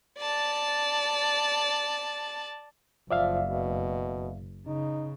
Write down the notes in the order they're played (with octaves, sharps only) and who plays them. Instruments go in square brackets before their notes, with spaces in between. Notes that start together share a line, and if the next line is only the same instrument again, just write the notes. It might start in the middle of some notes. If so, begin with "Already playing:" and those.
[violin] D5 A5
[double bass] F#1 [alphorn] F3 [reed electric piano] D5 E5 F5
[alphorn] B2
[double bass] C#3 [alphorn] D#4